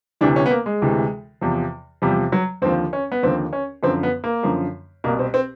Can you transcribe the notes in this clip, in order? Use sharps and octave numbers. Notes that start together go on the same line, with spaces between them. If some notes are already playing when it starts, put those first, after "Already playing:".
D2 C3 E3 D4
C#4
B3
A#3
G#3
D2 C3 E3
E2 C3 F3
E2 C3 F3 G3
F#3
D#2 D3 F3 C4
C#4
B3
D#2 D3 F3 C4
C#4
F#2 D3 F3 C4
B3
A#3
F#2 D3 F3
C2 B2 A#3
C4
C4